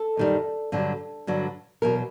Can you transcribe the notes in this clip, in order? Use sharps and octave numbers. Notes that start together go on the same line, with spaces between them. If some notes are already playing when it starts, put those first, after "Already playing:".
Already playing: A4
F#2 D#3 G3
G2 D3 F#3
G2 D3 F#3
E2 B2 F#3 A#4